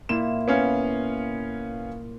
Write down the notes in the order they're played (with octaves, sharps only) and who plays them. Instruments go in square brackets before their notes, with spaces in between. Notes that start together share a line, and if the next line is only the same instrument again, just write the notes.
[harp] A#2 E4 [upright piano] E7
[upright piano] B3 C#4 F5